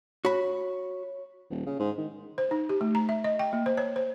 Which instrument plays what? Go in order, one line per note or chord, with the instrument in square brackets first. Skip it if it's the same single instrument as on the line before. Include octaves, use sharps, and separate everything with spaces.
[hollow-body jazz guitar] F#4 B5 [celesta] C#5
[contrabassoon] D#1
C#3
G#2
D#3
[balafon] C5
D#4
G4
A3
A#5
E5
D#5
G5
A#3
C5
C#5
C5